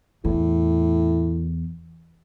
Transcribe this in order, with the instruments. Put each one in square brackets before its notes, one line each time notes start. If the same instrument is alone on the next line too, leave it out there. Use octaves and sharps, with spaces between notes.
[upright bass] E2 [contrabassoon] A2